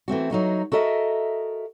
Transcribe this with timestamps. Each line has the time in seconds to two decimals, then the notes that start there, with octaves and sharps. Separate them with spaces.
0.08 E3 A3 C4 F#4
0.31 F#3 D#4 F#4
0.72 F#4 A4 A#4 D#5 E5